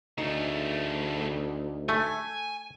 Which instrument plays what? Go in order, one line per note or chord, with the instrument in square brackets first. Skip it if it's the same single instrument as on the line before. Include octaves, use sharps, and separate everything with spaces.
[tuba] D2 [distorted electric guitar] C#3 A3 [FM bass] D#4
[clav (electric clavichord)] A3 [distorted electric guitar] G#5